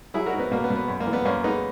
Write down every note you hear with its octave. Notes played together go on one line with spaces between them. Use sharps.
F#3 E4 G#4
F#4 A#4
G#2
B3
B2 A#3
B3
B2
B3
F#2
A#3
E3
B3
F#2 A#3 C#4
G#3 B3 D#4